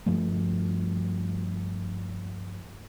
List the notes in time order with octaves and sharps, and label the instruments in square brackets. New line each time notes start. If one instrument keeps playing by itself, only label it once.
[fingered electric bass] G2 F3 A3